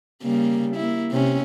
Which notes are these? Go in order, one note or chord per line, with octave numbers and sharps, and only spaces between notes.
C#3 G3 A#3
A#3 E4
C3 C#4